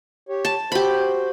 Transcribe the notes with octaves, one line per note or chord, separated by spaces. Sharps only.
G4 C#5
A5
F#4 G4 C5 B5